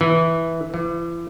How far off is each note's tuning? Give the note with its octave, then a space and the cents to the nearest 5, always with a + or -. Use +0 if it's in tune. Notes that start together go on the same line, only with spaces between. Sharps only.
E3 -5
E3 +40